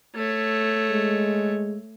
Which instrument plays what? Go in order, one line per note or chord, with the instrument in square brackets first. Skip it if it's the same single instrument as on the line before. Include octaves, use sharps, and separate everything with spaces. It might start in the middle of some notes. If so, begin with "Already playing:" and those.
[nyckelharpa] A3 C#5
[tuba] G#3